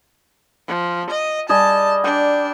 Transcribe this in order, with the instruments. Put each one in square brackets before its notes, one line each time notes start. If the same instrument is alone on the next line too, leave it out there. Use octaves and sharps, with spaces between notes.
[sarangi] F3
D#5
[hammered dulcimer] G3 G#4 D#5 [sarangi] A5
[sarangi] D4 [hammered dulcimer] G5